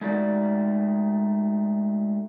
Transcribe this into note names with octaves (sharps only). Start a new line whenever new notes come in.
G#3 A3 D#4 F#4 D5